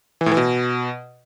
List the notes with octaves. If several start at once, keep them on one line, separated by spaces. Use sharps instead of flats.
E3
A2
E3
B2